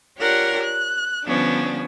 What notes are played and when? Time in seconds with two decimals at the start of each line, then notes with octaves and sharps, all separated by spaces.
0.18 D4 F4 G4 A#4 C#5 F#5
0.62 F#6
1.25 D3 F3 G3 B3 C#4 D4